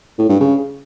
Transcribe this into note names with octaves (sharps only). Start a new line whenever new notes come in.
A2
G2
C#3